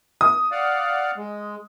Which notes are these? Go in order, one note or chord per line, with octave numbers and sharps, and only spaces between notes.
D#6
D5 F5 F#5
G#3